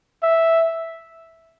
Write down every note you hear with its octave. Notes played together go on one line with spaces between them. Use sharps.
E5